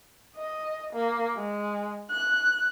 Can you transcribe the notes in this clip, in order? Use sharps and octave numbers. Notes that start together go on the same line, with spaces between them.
D#5
A#3
G#3
F#6